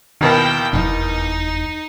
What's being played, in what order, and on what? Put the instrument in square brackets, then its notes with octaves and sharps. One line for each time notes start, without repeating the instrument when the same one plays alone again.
[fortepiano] D#2 B2 A#4 [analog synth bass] D#3 [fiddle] E4 G5
[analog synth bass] F1 [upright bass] E2 E4 [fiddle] D#4